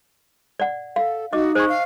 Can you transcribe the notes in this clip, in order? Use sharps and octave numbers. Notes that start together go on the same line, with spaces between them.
D5 F#5
A4 F5
D#4 F#4 D#5 D6
G#4 C5 C#6
F5